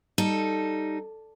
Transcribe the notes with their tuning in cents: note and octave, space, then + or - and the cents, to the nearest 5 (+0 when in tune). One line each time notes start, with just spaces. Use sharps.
G3 +0 D#4 +0 A4 +0